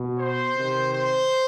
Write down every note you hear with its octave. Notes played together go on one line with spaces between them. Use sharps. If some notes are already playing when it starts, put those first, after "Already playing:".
Already playing: B2
C5
C3 D#3
C5